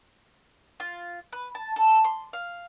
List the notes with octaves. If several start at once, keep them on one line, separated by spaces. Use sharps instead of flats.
F4
B4
A5
A4
C6
F5